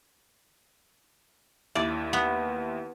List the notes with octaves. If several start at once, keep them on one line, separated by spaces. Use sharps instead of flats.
D#2 E4 D5 E5
B3